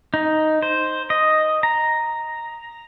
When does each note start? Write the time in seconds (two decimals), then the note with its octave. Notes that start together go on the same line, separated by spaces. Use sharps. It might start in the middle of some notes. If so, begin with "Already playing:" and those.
0.14 D#4
0.62 C5
1.10 D#5
1.63 A#5